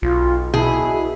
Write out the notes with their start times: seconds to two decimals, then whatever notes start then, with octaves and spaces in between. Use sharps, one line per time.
0.02 B1 F4
0.54 B2 E4 G#4